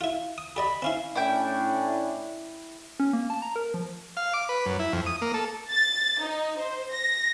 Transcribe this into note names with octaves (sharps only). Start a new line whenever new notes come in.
E4 F4
D#6
G4 D5 D#5 B5
C4 C#4 E4 F5
A2 C#4 D4 E4 G5
C#4
A#3
A5
A#5
A#4
F3
F5
D6
B4
F#2
E4
F2
D#6
A#3
A4
A6
D#4
C5
A#6